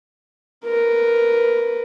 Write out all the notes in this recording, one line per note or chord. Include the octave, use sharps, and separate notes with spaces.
A#4 B4